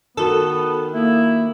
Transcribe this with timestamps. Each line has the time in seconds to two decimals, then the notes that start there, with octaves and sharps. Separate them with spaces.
0.17 D#3 B3 F#4 A4
0.93 A#3 E4